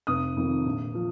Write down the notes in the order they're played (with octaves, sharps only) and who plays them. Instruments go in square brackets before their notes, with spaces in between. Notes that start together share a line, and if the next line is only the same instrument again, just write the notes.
[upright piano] F1 D#6
F2 D#3
A#1
F3